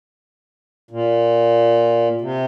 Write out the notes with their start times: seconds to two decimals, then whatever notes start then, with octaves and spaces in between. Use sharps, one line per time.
0.91 A#2
2.21 C3